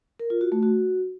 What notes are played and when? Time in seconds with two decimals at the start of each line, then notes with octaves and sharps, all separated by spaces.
0.20 A#4
0.30 F4
0.41 F#4
0.52 A3
0.63 F#4